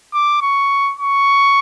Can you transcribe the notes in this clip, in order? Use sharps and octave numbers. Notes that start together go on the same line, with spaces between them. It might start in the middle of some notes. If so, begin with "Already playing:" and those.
D6
C#6
C#6